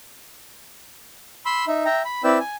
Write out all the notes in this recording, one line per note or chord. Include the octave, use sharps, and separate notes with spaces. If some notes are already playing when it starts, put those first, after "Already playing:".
B5 C6 E6
D#4 E5
E5 G5 A#5
B5
C4 E4 B4 D5 G5 E6
G#5